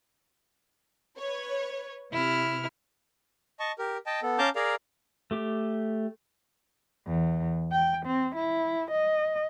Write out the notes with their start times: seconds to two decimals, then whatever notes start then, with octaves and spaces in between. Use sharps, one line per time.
1.17 B4 C#5
2.12 C3 E4 F6
3.60 D#5 A5 C#6
3.79 G4 A#4
4.06 D#5 G5 A5
4.23 B3 A4
4.38 C#4 F5 A5 A#5 D6 G6
4.56 G#4 A#4 D5 F5 A#5
5.31 A3 G4 D6
7.06 E2
7.72 G5
8.06 C4
8.35 E4
8.91 D#5